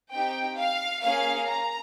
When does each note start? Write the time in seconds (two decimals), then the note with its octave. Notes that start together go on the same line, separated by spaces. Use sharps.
0.12 C4 D#4 G4 G5
0.58 F5
1.03 A#3 C#4 G#4 F5
1.49 A#5